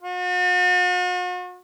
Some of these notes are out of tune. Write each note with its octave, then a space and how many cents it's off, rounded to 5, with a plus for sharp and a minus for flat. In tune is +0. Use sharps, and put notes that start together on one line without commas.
F#4 -45